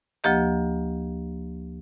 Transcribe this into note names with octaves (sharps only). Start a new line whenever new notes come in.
D2 F3 A#3 G4 D#5